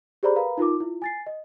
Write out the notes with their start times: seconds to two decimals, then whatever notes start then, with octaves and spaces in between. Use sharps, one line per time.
0.23 G4 G#4 C5 D5 A#5 B5
0.35 A#4 B4 F5 A#5 B5
0.58 D#4 F4 A#4 D6
0.80 E4 F4
1.02 G#5 A6 C7
1.26 D#5